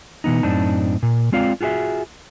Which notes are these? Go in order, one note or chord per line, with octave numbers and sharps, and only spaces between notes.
B2 E3 B3 D#4
F#2 A2 C4 D4 D#4 A5
A#2
G#3 C4 F4 D5 F5
F4 F#4 G#4 C#5 E5